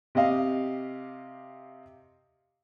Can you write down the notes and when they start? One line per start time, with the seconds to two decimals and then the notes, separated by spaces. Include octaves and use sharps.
0.15 C3 G4 D#5 F5